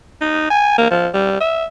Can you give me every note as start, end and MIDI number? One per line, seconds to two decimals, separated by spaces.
0.21 0.48 63
0.50 0.75 80
0.78 0.87 58
0.90 1.09 53
1.14 1.37 55
1.40 1.65 76